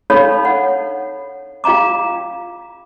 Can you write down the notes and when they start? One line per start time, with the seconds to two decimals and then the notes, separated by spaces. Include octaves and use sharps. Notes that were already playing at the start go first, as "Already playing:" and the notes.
0.10 D4 D#4 A4 C#5 F5 B5
0.45 F#5
1.64 F4 F5 G5 A#5 D6